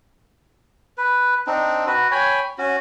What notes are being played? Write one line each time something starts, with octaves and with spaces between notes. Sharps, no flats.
B4
C4 D4 D#4
F#4 B4
C#5 G5 G#5 B5
C#4 F#4